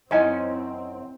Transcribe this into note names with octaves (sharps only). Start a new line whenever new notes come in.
F#2 C4 C#4 D#4 E4 D#5 G#5 A5